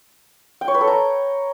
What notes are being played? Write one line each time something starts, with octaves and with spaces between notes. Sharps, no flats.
G5
C#5
B4
A4
A#5